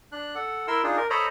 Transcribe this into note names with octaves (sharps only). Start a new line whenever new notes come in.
D4 F#6
A4 F#5
E4 A#4 C6 E6
D4 D#4 F4 G#4
A#4
A4 C5 C#5 D#5 A#5 B5